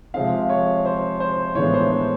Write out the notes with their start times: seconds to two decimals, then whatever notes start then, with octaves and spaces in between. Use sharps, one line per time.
0.14 C3 F3 G#3 C4 F5
0.49 C#5
0.85 C5
1.20 C5
1.55 A2 E3 G#3 B3 D4 C#5
1.74 C5
1.91 C5